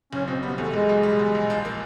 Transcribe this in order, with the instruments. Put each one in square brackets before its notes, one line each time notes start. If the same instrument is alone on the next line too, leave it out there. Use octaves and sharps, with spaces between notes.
[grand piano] F#1 [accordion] C#4
[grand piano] B2 [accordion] C4
[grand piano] G3 [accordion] B3
[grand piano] E2 [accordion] A3
[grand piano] F#1 [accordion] G#3
[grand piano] B2
G3
E2
A#1
F3
A#3